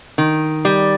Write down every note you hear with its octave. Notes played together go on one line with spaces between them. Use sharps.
D#3
G3